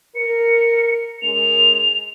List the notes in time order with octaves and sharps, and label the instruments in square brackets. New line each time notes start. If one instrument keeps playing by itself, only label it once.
[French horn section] A#4 [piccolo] C#7
[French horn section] G#3 C#4 A#4 [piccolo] F7